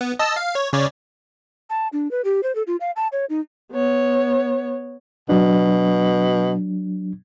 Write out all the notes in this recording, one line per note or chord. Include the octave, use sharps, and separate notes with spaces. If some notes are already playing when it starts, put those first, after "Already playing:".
B3
D#5 A5 E6
F5
C#5
C#3 C#5 D5
A5
D4
B4
G4
C5
A4
F4
F5
A5
C#5
D#4
B3 C#5
B2 F#3 D4